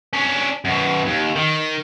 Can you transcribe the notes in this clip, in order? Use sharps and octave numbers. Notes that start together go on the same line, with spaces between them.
C#4 D4
F#2 B2
D#2
D#3